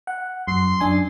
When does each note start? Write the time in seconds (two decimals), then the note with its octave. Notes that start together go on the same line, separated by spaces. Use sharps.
0.07 F#5
0.48 F#2 C6
0.81 F#2 D4 G#5